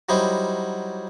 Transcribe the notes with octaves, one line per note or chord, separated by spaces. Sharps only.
F#3 G3 D#4 E4 C5